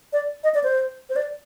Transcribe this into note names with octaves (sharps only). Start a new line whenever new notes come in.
D5
D#5
D5
C5
C5
D5